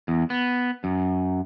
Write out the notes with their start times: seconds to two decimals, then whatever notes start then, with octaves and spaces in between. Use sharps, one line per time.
0.08 E2
0.30 B3
0.84 F#2